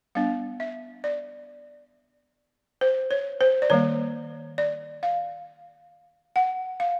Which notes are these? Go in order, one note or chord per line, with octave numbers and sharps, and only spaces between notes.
G3 B3 D4 F5
E5
D5
C5
C#5
C5
D5
D#3 G3 A#3 C#5
D5
F5
F#5
F5